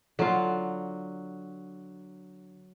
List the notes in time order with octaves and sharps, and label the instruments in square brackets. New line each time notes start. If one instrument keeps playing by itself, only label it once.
[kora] D3 F4 [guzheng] F#3